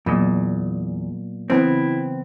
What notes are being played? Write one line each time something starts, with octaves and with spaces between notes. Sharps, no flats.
E2 A#2 F#3 B3 D#5
C#3 E3 B3 C4 E4